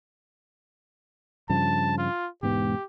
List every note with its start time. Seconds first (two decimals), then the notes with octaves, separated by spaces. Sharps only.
1.50 G2 C#3 F3 A5
1.98 F4
2.43 E1 G#2 B3 G4